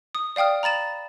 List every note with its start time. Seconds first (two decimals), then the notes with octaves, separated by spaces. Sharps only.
0.15 D#6
0.36 D5 F5 G5 D#6 F6
0.63 A#5 B5 A6 E7